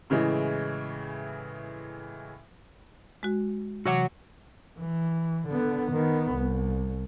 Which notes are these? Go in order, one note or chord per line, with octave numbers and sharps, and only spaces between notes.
A2 C#3 E3 G#3
G#3 F#4
C3 E3 F#4 C#5 F#5 D6
E3
D3 B3
D#3 B3
C2